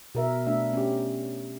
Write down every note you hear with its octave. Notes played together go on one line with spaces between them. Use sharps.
B2 A#4 E5
A3 B3 D4 E5
C#4 G4